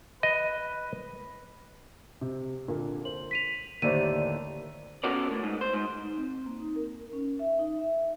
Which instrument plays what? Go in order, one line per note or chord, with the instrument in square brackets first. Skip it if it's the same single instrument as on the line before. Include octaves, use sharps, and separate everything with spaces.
[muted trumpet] B4 [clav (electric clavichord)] D#5
[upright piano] C3
A#2 D3 A#3
[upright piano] C5 [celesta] F#7
[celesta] B6 D#7 F7
[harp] D#2 A2 D3 [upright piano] D#3 [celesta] C5 D5 D#7
[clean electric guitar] B3 C#4 F#4 A4 A#4 D5
A2
G#2
C5
G#2
[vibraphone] D#4
C4
A#3
D#4
A#4
C#4
E5
D#4
E5